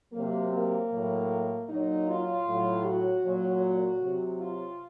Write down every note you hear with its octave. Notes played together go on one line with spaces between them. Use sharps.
C3 F#3 A#3
A#3
A2 F#3
A#2 F#3 D#4
F4
A2 F#3
F#4
A#2 F#3
C3 F#3
F4